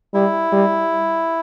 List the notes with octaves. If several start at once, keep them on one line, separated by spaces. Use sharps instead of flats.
G3 E4
G3